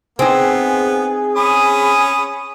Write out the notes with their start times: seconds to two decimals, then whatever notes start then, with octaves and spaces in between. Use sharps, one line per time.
0.19 B3 C4 D#4 G#4
1.35 C#4 B5 D#6